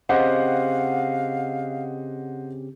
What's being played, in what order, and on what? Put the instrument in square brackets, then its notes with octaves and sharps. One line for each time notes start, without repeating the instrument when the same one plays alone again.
[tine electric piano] C#3 C4 G4 [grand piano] C5 D#5 F#5 [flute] F5